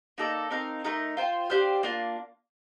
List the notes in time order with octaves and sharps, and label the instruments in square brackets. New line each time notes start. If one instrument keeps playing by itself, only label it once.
[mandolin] A#3 D#4 A4 D5
C4 D#4 A#4 F5
A3 D#4 A#4
F4 C5 G5
D4 G4 C5 F5
A#3 D4 F4